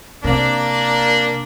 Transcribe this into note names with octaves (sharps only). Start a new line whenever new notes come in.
C3 A#3 D4